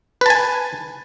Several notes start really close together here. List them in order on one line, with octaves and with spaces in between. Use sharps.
B4 A5 G#5